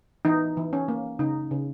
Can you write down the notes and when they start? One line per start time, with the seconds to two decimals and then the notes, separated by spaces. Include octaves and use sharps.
0.25 E3 D#4
0.57 E3
0.73 C#4
0.88 A#3
1.19 C#3 D#4
1.51 C#3